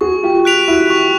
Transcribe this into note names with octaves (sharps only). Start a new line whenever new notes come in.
F#4 G#4 C#6
F4 G4
F#6 B6 D7 F7
E4 F#4
C#6